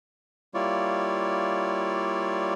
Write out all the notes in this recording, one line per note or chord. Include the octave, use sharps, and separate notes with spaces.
G3 A#3 E4 F4 C#5 D5